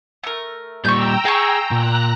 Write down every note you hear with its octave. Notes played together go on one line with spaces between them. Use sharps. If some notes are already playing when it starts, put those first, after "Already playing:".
A3 A#4
A#2 G3 G5 A#5 C#6 E6 G6
G#4 F5 G#5 C#6
A#2 A#5 F#6 A#6